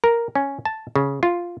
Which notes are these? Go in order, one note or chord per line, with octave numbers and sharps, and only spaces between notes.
A#4
C#4
A5
C#3
F4